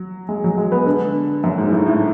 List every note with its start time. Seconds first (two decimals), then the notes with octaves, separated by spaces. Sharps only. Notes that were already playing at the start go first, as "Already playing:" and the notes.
Already playing: F#3
0.29 G#3
0.44 F#3
0.58 G#3
0.72 B3
0.86 D3
1.44 F#2
1.58 G#2
1.72 A2
1.86 A2